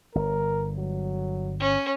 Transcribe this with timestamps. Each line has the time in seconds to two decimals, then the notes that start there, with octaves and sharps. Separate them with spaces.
0.15 G1 A#4
0.78 F#3
1.60 C#4